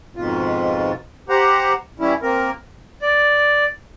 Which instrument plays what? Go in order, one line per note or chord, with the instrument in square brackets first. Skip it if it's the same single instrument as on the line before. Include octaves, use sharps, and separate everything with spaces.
[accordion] F2 G#2 B2 F4
G4 C5 F#5 A#5
E3 G3 C#4 E4
A#3 C4 A#4
[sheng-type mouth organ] D5